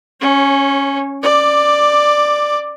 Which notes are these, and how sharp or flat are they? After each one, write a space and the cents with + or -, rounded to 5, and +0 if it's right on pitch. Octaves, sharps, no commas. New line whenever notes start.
C#4 +0 C#5 -30
D5 +10 D6 +0